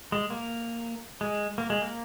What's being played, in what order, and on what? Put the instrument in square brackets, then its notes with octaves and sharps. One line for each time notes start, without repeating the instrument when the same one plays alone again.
[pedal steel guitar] G#3
A#3
G#3
A#3
G#3
A#3